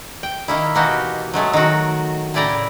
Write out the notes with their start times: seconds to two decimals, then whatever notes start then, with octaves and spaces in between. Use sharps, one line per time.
0.23 G5
0.48 D#3 A#3 E4
0.75 B2 E3 A#3 D#4 F#4 G4
1.34 F#3 G#3 A3
1.53 D#3 F#4
2.34 A2 C#3 E4 D5 G5 A#5